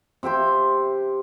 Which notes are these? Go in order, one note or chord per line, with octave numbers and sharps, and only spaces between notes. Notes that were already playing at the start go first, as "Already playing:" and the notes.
C3 E5 G5 C6